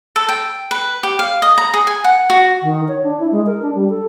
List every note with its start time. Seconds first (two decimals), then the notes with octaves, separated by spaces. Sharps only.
0.16 A4
0.29 G5
0.71 B4
1.03 G4
1.19 F5
1.42 D#5
1.58 A#5
1.74 G#4
1.87 G#5
2.04 F#5
2.30 F#4
2.63 D#3
2.88 C#5
3.03 D4
3.20 E4
3.32 G#3
3.46 A#4
3.62 D4
3.75 G3
3.90 A4